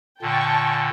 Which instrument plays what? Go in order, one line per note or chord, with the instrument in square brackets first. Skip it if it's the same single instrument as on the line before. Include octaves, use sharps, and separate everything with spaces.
[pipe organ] A#2 D3 [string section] G5 A5 C#6